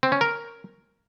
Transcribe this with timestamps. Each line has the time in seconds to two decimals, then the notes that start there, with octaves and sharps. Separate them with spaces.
0.03 C4
0.12 C#4
0.21 A#4